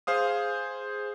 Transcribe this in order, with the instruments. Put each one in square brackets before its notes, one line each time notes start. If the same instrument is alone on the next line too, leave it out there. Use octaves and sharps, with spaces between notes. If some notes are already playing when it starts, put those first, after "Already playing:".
[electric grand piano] G#4 C5 F5 D#6